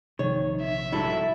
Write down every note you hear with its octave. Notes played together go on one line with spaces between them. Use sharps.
A#1 C3 D#3 F3 C#5
E5
G2 E4 F#4 A4